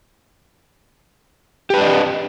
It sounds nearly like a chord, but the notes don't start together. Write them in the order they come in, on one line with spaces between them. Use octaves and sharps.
G4 B4 D4 D#5